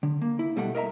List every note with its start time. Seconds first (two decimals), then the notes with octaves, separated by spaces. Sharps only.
0.03 D3
0.22 A#3
0.39 E4
0.56 B1 B2 G3 A3 F#5
0.75 A#4 D#5 E5 A#5